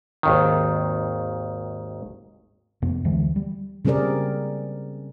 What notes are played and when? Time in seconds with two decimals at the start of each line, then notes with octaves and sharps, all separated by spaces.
0.23 G#1 D#2 D#3
2.82 F2 C3 B3
3.05 D2 D3 E3 G#3
3.36 G3
3.85 C#3 G3 C4 G#4 A#4 D5